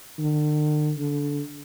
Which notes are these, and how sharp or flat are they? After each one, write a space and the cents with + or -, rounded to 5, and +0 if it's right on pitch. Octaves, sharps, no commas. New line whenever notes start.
D3 +45
D3 -20